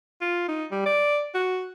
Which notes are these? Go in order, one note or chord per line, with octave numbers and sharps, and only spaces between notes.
F4
D#4
G3
D5
F#4